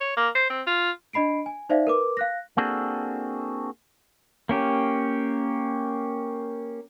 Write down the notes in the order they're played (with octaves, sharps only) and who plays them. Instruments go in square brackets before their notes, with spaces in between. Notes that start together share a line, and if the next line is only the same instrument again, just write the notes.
[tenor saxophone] C#5
A#3
C5
C4
F4
[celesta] D4 D#5 B5 C7 D7
G#5
D#4 C5 D5 E5 F5
A#4 B4 D6
F5 F#6 A#6
[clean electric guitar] A#3 C4 D4 F#4 G#4 A4
[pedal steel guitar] A#3 C#4 G4